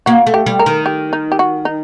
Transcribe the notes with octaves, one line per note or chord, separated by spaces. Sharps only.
A#3 F#4
A3
G4
G3
A#4
D#3
G4
D#4
G4
F#4
D#4